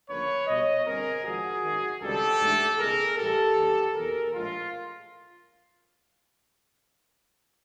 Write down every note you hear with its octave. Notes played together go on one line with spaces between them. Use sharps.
D2 C#3 F3 A#3 B4 C#5
B1 B2 G3 C#5 D#5
G1 G2 D3 G3 C4 G#4 A#4
G#1 G#2 F3 F#4 G#4
G#1 F#2 D#3
C#2 C3 D#3 G3 G4 A4
G#2 E3 A3 D4
C#2 B2 G#3 G#4 A#4
A2 E3 G3 G4 A4
D#2 D3 F#3
F#1 E2 B2 G#4 A#4
A#1 A2 F3 G#3 F4